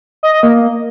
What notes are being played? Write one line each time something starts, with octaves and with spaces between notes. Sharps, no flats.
D#5
D#5
A#3